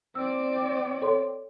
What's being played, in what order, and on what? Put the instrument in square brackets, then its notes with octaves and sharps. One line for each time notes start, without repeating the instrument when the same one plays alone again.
[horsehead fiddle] C4 D5 [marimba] E6
[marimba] A4 C#5 C6